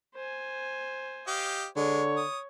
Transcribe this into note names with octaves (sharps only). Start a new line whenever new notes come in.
C5 G#5
G4 D#5 F5
D3 G#3 C#5
D#6